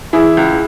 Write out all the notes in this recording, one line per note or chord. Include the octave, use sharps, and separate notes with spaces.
E3 E4 G#4
C#2